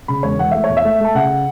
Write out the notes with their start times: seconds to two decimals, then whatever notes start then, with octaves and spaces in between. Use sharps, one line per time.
0.08 C#3 B5
0.23 E1 C#5
0.39 E3 F#5
0.51 A3 E5
0.64 C#5
0.70 E2
0.77 E5
0.84 A3
1.00 A3 A5
1.15 C#3 F#5